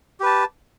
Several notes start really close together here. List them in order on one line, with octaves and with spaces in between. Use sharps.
G4 B4 A5